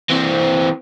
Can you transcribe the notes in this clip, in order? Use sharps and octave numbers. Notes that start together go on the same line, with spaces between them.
E3 C4